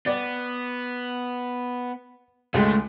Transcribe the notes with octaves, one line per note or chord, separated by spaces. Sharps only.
B3 D5
C#2 G#3 A3